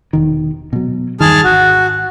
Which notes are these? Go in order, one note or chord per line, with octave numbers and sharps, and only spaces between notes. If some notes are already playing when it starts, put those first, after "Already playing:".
E1 D#3
B2 F#3
E2 G2 D#3 G#4 A5 F6
G#1 F#4